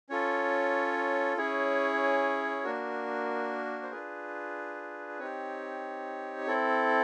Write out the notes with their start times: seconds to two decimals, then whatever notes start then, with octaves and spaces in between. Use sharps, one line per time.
0.10 C#4 F4 A4 C#5
1.37 C#4 E4 G#4 C#5
2.64 A#3 D4 F#4 A#4
3.83 C5
3.91 D4 F4 G#4 B4
5.19 C4 D#4 G4 C#5
6.46 C4 E4 A4